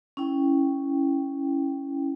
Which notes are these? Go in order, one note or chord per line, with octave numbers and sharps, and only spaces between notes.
C#4 E4 G5